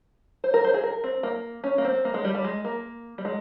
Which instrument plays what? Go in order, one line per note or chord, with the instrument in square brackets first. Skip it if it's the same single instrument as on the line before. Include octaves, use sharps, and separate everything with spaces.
[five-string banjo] C5
A#4
C5
G#4
A#4
C4
A#3
C#4
A#3
C4
A#3
G#3
G3
G3
G#3
A#3
G3
G#3